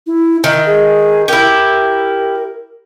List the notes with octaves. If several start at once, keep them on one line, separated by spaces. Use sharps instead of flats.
E4
D#3 E5
G#4
E4 G4 A#4